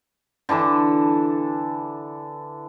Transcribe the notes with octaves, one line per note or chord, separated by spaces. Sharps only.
D3 E3 D4 A4